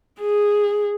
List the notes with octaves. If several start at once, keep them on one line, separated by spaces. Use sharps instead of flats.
G#4